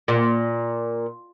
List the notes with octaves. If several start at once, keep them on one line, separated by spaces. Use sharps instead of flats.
A#2